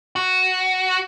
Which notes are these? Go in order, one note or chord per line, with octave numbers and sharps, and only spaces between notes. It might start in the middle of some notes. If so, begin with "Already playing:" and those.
F#4